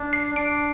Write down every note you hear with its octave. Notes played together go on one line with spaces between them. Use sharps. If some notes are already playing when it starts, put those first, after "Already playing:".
Already playing: D4
C7
D4 D7